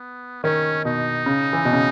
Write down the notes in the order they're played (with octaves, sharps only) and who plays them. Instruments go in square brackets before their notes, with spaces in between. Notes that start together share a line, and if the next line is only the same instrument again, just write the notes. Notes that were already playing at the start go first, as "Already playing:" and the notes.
Already playing: [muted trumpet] B3
[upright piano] D#3 [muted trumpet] C#4
[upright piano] B2 [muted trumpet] D#4
[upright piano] C#3
E3
B2
C#3